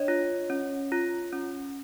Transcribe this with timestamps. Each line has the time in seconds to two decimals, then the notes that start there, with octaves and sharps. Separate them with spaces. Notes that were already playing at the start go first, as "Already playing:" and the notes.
Already playing: D4 C#5 D#5
0.08 F4
0.50 C#4
0.92 F4
1.33 C#4